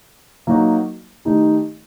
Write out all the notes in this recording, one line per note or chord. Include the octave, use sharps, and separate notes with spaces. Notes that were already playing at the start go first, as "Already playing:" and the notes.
F#3 A#3 D#4 F#4
D#3 A3 D#4 G4